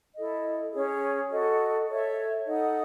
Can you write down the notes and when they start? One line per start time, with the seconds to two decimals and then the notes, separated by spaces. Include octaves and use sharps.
0.15 E4 A4 D#5
0.72 C#4 G#4 C#5
1.30 F#4 A4 D#5
1.87 A4 C#5 E5
2.46 D#4 A4 D#5 F#5